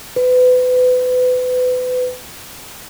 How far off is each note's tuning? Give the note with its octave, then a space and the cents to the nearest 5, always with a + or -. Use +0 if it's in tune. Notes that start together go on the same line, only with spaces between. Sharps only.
B4 +30